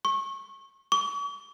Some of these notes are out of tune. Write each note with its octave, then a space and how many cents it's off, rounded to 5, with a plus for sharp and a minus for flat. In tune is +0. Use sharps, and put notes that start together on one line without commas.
C#6 -25
C#6 +45